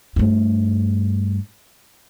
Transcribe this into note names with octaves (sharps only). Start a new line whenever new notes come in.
G2 A3